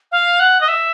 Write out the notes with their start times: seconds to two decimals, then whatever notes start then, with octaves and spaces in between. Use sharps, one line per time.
0.12 F5
0.39 F#5
0.61 D#5
0.68 E5